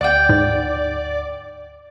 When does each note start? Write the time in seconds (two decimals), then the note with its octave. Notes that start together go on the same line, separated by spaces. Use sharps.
0.01 D2 D5 F#5 G5 D6
0.29 G#2